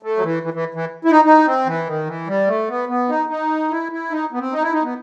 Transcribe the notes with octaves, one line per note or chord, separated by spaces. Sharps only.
A3
F#3
E3
E3
E3
E3
E4
D#4
D#4
C4
E3
D#3
E3
G3
A3
B3
B3
D#4
D#4
E4
E4
D#4
B3
C4
D#4
E4
D#4
B3